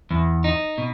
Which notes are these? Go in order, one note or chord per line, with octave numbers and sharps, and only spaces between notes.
E2
D#4
B2